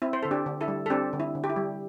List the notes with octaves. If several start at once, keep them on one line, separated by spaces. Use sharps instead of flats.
C4 E4
C5
D3 A4
D4 G4
D3
E4 A4
G3
A4
C4 D4 G4
D3
E4
D3
G4
E4
G3